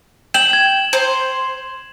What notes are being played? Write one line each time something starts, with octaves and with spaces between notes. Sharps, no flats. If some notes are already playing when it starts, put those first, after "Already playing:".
G5 E7 F#7
G#6
C5